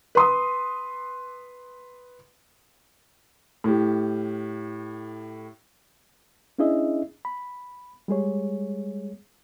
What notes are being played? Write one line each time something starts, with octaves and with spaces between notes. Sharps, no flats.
B4 C6 D#6
A2 G4
C#4 D4 E4 G#4 D#5 E5
B5
G3 G#3 G#4 C#5